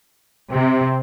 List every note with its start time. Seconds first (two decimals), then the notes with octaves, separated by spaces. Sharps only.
0.50 C3 C4